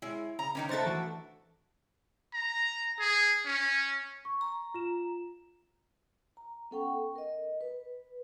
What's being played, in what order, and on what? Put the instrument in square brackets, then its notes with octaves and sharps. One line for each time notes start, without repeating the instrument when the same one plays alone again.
[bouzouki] G#3 C#4 [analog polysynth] E4
[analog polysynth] C#3 [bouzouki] A#5
[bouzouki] D#3 E3 A#3 [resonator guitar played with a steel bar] C#4 D#4
[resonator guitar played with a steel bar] A3 D4 A4 [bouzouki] C#4 E4 [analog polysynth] C5 A#5 A6
[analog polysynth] E3 F#4
[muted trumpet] A#5
G#4
C#4
[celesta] C#6
[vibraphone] A#5
[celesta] F4 E7
[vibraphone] A#5
B3 C#4 A4 F#5 G5 C#6
A#4 D#5
B4